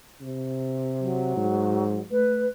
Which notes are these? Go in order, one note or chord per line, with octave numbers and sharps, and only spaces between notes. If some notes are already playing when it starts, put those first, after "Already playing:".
C3
F#3
G#2
A3 B4